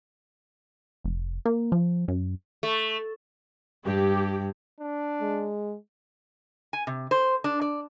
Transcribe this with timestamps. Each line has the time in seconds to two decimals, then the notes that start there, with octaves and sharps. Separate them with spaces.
1.04 F1
1.45 A#3
1.72 F3
2.08 F#2
2.63 A3
3.85 G2 G4
4.79 D4
5.21 G#3
6.73 G#5
6.87 C3
7.11 C5
7.44 D4
7.61 D5